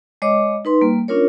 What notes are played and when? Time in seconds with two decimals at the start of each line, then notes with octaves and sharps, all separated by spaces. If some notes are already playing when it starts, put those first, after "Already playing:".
0.22 G#3 C#5 D#5 D6
0.65 D#4 B4 C6
0.81 G3 A#3
1.08 C#4 D4 F4 A#4 C#5